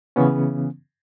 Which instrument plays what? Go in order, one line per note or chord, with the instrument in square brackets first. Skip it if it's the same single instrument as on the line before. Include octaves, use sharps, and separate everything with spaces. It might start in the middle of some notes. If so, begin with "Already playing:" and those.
[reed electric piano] C#3 E3 B3 C#4